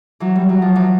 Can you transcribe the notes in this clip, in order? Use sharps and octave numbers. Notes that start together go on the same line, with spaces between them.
E3 F#3
G3
F#3
F3
E3 F#3